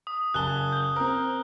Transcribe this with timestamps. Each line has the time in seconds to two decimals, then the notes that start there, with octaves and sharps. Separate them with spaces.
0.07 D#6
0.34 F#1 G#5 A5 F#6 G7
0.72 G6 G7
0.96 C4 A#4